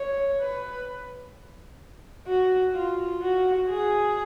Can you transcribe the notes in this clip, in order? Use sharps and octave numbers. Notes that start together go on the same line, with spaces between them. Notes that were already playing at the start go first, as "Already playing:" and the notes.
Already playing: C#5
B4
F#4
F4
F#4
G#4